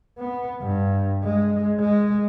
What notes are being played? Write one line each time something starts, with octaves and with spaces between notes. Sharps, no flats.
B3
G2
G#3
G#3